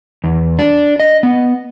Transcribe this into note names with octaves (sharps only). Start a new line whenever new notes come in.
E2
D4
D#5
B3